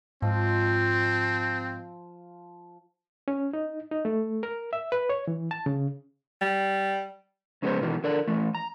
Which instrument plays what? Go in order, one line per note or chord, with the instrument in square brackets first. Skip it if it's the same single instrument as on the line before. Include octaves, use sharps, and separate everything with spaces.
[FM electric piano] G#2 [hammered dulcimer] F3 [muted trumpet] C4
[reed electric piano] C#4
D#4
D#4
A3
A#4
E5
B4
C#5
E3
A5
C#3
[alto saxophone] G3
[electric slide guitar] F2 C#3 G#3 B3 D4 C5
B2 D#3 E3
D3 A#4 D5
E3 A3
A#5